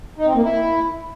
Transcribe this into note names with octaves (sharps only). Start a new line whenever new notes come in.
D#4
C4
A#3
E4